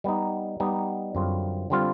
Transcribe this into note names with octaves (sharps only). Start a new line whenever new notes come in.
G3 B3 D#4
G3 B3 D#4
F#2 D3 G3 C4 F4
D3 G3 C4 F4